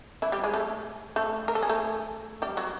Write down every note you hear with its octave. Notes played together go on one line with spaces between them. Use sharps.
E3 E4
G3 G4
G#3 G#4
A3 A4
A3 A4
A#4
A4
G#4
A3 A4
G3 G4
F#3 F#4